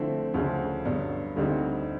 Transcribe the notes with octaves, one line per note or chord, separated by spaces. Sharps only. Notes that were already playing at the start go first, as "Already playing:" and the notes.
Already playing: D3 F3 A3 C4 E4
D2 C#3 F3
G2 D3 F#3 B3
D2 D3 G3 C4 D#4